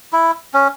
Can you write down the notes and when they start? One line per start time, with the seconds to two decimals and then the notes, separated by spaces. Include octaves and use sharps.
0.13 E4
0.54 C#4